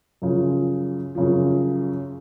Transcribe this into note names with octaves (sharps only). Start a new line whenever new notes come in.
F#2 C#3 F3
F#2 C#3 F3